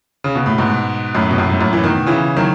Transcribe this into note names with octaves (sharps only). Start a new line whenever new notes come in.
C#3
B2
A2
G#2 B2
F#2 A2
B2
F#2 A2
G#2
F#2 A2
E3
B2 D#3
C#3 E3
D#3 F#3